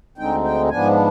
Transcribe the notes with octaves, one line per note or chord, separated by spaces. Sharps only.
D2 D3 G#3 C4 D#4 G5
G5
G#2 F3 B3 D4 G#5